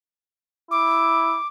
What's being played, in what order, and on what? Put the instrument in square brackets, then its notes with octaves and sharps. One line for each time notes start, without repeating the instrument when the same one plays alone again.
[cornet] E4 [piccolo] D6